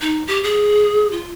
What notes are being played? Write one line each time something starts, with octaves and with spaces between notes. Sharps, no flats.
D#4
G4
G#4
F4